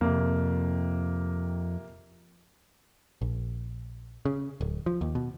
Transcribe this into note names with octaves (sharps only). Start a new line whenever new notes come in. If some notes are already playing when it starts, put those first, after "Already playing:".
F2 C3 A#3
A#1
C#3
D1
F3
D#2
B2